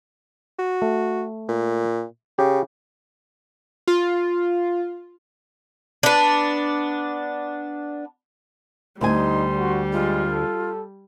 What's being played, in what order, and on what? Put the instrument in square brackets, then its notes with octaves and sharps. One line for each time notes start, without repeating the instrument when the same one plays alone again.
[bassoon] F#4
[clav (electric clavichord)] A3
[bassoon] A#2
[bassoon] C#3 [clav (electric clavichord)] G4
[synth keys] F4
[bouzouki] B3 D4
[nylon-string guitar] D2 G#5 [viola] G3 [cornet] D#4 [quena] C6
[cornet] F#4
[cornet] G#3 [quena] F4
[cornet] A4